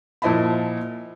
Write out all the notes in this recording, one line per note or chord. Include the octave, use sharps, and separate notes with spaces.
A#2 F3 E4 D#5 A5 B5